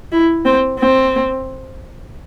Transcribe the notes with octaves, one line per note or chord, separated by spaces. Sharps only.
E4
C4
C4